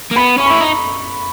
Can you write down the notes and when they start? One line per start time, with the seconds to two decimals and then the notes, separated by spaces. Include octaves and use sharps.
0.11 A#3
0.16 B3 B5
0.38 C#4 C#6
0.46 B5
0.50 E4
0.61 D#4